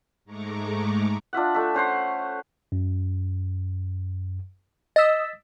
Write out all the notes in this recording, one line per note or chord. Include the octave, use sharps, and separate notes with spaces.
G#2 G#3 A3 A#5 C#6 D6
D4 F4 E5 F#5
A3 E5
C#4 C5 F#5 C6
F#2
D#5 E6 A6 B6